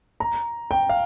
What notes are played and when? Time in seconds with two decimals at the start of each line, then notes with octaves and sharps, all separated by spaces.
0.20 A#5
0.71 G5
0.89 F5